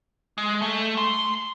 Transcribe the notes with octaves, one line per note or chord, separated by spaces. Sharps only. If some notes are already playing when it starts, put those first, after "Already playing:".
G#3
A3
C6